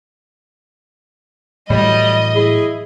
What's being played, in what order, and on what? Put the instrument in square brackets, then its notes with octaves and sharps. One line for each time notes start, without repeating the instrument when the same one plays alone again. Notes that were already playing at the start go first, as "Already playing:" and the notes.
[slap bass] A2 E3 F#3 [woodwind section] G3 [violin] D#5
[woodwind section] E4 G#4